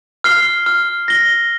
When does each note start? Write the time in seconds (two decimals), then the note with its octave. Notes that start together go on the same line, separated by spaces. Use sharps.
0.24 F6 C7 G7
0.66 F6
1.08 A#6 G7